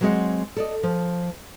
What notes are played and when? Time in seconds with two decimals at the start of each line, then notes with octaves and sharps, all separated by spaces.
0.01 F#3 G#3 C4 G#4 D#5 F#5
0.56 A4 D5 D#5
0.83 F3